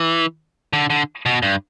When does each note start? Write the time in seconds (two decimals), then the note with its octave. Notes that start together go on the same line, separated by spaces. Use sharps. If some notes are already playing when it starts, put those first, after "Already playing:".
Already playing: E3
0.73 D3
0.90 D3
1.26 B2
1.42 G2